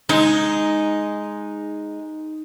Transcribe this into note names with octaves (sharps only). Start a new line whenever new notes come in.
G#3 D#4